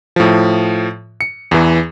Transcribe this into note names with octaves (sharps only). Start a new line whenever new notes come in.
A2 F3
C#7
E2 E3